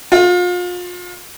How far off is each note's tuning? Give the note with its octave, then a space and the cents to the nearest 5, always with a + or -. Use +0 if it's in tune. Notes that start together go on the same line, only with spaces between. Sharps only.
F4 +35